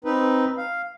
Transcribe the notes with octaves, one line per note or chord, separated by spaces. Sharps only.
C4 D#4 B4
F5